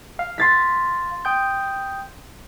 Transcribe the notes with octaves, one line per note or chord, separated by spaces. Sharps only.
F5
C6 A6 B6
G5 D#6 G6